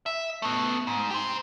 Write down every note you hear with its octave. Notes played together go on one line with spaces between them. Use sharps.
E5
A3 B3
G#2
G4 C5